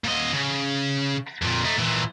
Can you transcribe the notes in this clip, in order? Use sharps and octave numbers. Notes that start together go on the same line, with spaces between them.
A#2 D#5
C#3
F2 A#2
A3 D#4
A#2 E3